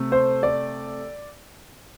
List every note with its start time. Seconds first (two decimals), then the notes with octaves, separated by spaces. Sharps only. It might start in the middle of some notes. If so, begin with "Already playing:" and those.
Already playing: C3 A3
0.12 C5
0.43 D5